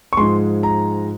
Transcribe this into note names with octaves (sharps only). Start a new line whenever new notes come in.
C#6
G#2 F3 G#3 C6
A#5